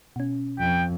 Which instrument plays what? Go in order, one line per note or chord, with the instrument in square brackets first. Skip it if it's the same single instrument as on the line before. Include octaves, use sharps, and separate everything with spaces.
[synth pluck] B2 C#4
[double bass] F2 [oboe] G5